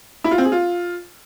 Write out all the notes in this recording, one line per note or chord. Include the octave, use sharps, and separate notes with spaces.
E4
F4
C4
G#4
F4